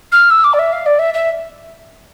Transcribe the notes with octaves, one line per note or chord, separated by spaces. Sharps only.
F6
E6
D6
D5
E5
F5
D5
E5
E5